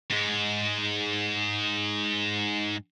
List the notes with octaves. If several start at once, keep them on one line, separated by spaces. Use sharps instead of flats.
G#2 G#3